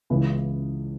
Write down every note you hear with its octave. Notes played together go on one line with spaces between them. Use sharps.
C#2 C#3 E3 B3 B4